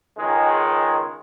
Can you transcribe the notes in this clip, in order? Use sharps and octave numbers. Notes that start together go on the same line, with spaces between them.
C#2 D#3 G#3